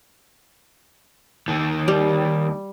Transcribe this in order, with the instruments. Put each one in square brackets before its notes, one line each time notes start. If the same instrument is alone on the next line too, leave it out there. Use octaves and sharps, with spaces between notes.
[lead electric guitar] D#2 D#3
[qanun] G3